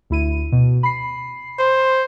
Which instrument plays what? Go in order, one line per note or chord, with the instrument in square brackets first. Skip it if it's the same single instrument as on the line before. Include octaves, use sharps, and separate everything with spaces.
[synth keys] D2 E4 D#7
B2
B5 C7
[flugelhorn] C5